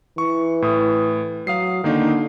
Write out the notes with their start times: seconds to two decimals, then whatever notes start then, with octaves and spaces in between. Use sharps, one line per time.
0.18 E3 C#6
0.62 A2 D#6
1.47 F#3 F5 D#6 C7
1.84 D3 D#3 A#3 D#4